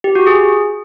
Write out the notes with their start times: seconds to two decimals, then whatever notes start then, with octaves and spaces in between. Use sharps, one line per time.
0.04 G4
0.15 F#4
0.27 G#4